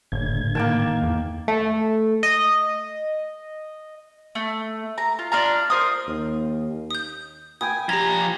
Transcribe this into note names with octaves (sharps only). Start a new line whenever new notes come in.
F#1 A2 D3 G#6
D#3 A#3 G5 A5
E2
A3
D#5
A3
A#5
F4
D4 F4 F5 A#5
A#4 C5 D#6
D#2
D#6 G6
G5 G#5 B5 D#6
F3 G4 A#5 G#6